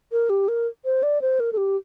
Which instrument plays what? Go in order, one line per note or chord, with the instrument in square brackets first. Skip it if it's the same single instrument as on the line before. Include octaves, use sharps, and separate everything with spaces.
[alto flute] A#4
G4
A#4
C5
D5
C5
A#4
A4
G4